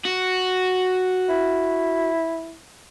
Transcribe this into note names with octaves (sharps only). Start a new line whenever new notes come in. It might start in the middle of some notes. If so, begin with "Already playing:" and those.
F#4
E4